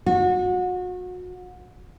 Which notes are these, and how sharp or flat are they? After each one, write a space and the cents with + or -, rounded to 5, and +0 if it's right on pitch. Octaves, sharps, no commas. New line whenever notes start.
F#4 -30